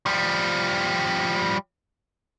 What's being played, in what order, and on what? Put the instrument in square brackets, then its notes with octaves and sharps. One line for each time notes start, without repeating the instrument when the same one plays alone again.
[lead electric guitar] F3 G3